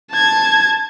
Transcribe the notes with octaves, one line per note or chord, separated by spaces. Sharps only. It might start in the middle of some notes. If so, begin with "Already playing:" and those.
A5 G#6